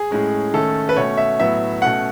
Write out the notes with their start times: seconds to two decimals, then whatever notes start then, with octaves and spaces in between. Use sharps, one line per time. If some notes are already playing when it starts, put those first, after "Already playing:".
Already playing: G#4
0.11 A2 G#3 C#4
0.54 D#3 A3 C#4 A4
0.89 B4
0.96 B2 A3 C#4 C#5
1.17 E5
1.40 A2 F#3 B3 E5
1.82 B2 A3 C#4 F#5